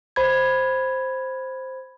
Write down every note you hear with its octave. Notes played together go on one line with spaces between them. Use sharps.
C5 B5 G#6